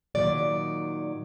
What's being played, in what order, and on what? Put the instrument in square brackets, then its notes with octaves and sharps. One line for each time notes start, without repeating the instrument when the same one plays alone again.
[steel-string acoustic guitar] A#2 D#3 F#3 D5